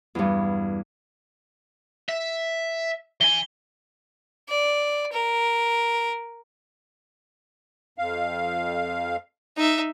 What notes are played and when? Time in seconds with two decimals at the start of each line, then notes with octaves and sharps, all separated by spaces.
0.15 E2 G2
2.09 E5
3.21 E3 G#5 G7
4.49 D5
5.12 A#4
7.98 F2 F5
9.56 D#4 E5